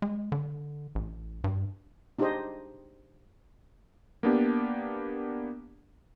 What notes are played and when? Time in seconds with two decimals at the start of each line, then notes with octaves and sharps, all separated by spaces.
0.02 G#3
0.32 D3
0.95 A1
1.44 G2
2.19 D4 D#4 G4 G#4 C5 D#5
4.23 A#3 B3 D4 G4